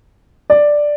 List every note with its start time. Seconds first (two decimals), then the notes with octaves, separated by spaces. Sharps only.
0.50 D5